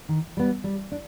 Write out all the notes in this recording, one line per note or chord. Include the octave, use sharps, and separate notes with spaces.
D#3
G3 B3
G3
D4